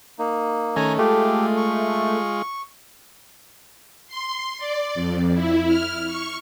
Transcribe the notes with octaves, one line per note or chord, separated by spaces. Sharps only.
A#3 D#4
D#3 A3 C#4 G#5 A#5
G#3 A3 F4 G4
C#6
C6
D5
F2
E4
F6
C#6